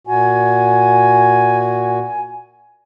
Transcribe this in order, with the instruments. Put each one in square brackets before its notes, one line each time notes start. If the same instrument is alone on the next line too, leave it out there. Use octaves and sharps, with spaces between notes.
[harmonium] A#2 F#4 [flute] G#5